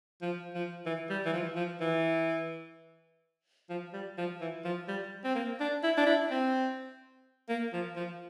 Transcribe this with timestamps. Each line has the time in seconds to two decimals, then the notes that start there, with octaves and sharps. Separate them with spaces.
0.22 F3
0.54 F3
0.86 E3
1.10 G3
1.25 E3
1.33 F3
1.56 F3
1.81 E3
3.69 F3
3.93 G3
4.18 F3
4.41 E3
4.65 F3
4.88 G3
5.24 C4
5.35 A#3
5.60 D4
5.83 E4
5.97 D4
6.07 E4
6.31 C4
7.49 A#3
7.73 F3
7.96 F3